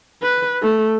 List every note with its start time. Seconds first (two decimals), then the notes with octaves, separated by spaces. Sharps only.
0.23 B4
0.62 A3